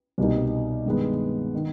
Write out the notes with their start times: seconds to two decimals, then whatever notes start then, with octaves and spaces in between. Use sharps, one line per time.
0.18 C2 B2 G3 A#3 D#4
0.86 G2 D#3 G#3 B3
1.55 D#3